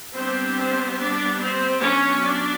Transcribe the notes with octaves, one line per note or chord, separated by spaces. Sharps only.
G3 B3 C4 D4 C5
D4 D5
C4 C5
F#3 B3 C#4 D4 C#5
D4 D5